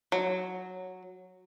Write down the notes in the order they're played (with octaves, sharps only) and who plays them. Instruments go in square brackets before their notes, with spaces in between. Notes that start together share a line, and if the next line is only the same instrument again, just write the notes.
[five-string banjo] F#3